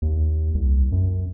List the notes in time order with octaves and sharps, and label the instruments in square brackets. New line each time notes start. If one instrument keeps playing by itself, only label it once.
[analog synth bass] D#2
C2
F#2